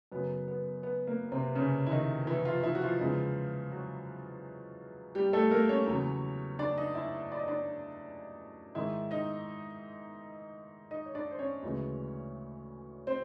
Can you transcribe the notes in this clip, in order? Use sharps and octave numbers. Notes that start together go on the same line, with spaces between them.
F#2 C#3 F#3 B3
B3
B3
A#3
C3 C4
C#3 C#4
E4
D#3 D#4
E3 E4
F3 F4
E3 E4
F#4
F3 F4
E2 C#3 E3 G#3
F#3 F#4
G3 G4
A3 A4
A#3 A#4
C#4 C#5
E2 C#3 F#3
D4 D5
D#4 D#5
E4 E5
D5
D#5
D4 D5
G#2 D#3 G#3 E4 E5
D#4 D#5
D#4 D#5
C#5
D4 D5
C5
C#4 C#5
D2 C#3 E3 G#3
C4 C5